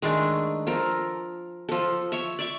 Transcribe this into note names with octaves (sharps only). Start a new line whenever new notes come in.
D#3 G#3 A3 D4
F3 A4 A#4
F3 A4
C#5 E5
D5 E5 C#6